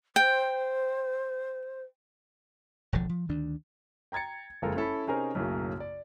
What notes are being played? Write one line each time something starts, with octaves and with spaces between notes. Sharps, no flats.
C5 G5
E1 B1 D3 F3
F3
D2 D#3 D4
G5 A#5 G#6 A6 C#7
F#1 F2 G#3 F4 A4 A#4
C#4 E4 A4 A5 B5
C3 C#4 D#4 G#4 A#4 C5
B1 F#2 A2 C#3 F#3 A#3
D5